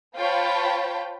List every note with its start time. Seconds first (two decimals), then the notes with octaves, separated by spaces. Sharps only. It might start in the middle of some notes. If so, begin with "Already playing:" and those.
0.17 F4 C5 C#5 G5 A5 B5